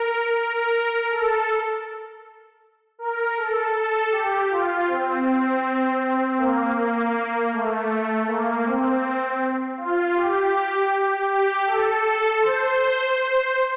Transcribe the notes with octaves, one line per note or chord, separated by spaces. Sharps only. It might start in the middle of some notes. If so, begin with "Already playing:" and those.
Already playing: A#4
A#4
A4
A#4
A4
A4
G4
F4
C4
C4
A#3
A#3
A3
A#3
C4
F4
G4
G4
A4
C5